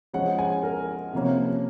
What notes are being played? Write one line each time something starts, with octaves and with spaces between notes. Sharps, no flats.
F3 G#3 C#4 F#5
G#5
A#4
C3 F3 A#3 C#4